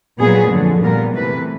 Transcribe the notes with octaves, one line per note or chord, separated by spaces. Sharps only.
A#2 F#3 B3 G#4
F2 D3 F#3
A#2 G3 B3 A#4
C3 E3 A3 B4